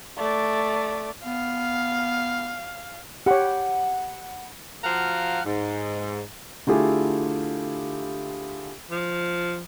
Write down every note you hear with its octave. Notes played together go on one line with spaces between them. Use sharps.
A3 D5
B3 F5
G4 C#5 F#5 B5
F3 F#4 F5 F#5 A#5
G#2
D3 A3 E4 F4 G4 G#4
F3